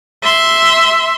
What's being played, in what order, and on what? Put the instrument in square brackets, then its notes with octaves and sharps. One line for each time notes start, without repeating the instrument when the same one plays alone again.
[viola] E5 C6